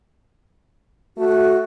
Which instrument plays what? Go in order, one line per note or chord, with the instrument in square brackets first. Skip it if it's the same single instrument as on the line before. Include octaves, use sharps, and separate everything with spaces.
[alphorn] A3 [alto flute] F#4